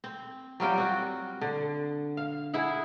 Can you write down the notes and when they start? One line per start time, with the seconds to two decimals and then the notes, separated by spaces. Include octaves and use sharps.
0.04 C4
0.60 F#3 G3 F4 G5
0.78 C4 F#4
1.41 D3
2.17 F5
2.53 E4 G#4 E5 F#5